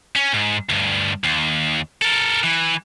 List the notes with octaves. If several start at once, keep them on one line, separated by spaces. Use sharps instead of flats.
C#4
G#2
D2 G2
D#2
A4 A#4
E3